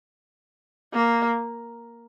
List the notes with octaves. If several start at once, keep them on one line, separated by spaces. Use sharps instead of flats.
A#3